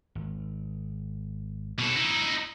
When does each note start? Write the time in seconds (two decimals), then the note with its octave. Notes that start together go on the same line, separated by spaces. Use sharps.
0.15 G#1
1.79 B2 A4
1.96 D#4 E4